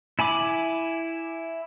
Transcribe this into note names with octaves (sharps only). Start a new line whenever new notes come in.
E4 G#5 B5 D6